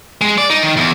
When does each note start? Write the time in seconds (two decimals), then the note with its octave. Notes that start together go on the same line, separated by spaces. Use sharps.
0.22 G#3
0.38 D5
0.50 D#4
0.63 D#3
0.77 E2